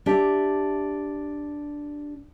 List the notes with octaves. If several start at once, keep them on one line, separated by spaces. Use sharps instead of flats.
D4 G4 E5